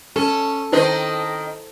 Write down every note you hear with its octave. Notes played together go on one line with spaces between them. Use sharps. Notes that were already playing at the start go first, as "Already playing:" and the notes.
C#4 A4
D#3 C4 E4 C5 D#5